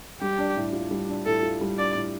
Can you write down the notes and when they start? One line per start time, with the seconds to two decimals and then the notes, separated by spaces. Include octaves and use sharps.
0.21 G3 G4
0.38 D4
0.57 A2
0.73 F4
0.91 G3
1.09 D4
1.26 A2 A4
1.43 F4
1.61 G3
1.78 D4 D5
1.95 A2